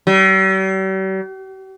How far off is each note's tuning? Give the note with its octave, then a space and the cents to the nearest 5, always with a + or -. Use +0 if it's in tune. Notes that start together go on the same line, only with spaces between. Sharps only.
G3 -45